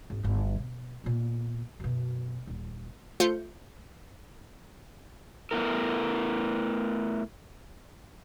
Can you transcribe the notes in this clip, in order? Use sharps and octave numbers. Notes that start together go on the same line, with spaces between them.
G#1
G1 D2
B2
A#2 B3
F#2 B2
D#1
A3 F4 C5 G6 C#7
A3 B3 E4 A#4